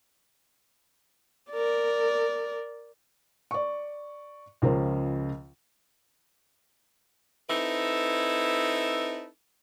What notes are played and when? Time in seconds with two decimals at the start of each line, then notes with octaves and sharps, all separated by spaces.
1.52 A#4 D5
3.51 D5 C#6
4.62 C#2 C#3 F3 A#4 C5
7.49 C4 D#4 E4 A4 B4